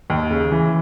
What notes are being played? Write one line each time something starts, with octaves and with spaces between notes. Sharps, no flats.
D#2
C#3
E3